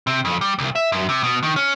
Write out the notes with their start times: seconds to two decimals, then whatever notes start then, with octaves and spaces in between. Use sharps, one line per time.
0.07 C3
0.25 F2
0.41 G3
0.59 C2
0.75 E5
0.92 F#2
1.09 C3
1.23 B2
1.43 D#3
1.57 C#4